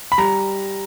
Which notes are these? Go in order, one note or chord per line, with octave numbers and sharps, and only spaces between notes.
B5
G3 A#5